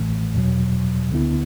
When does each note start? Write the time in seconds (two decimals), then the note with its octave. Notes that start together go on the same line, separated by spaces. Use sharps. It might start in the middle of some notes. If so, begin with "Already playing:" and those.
Already playing: A1 A2 E3 A3
0.34 E2 B2 F#3
1.11 D2 D3 B3 E4